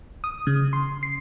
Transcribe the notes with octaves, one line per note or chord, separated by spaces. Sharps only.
D#6
C#3
C6
C7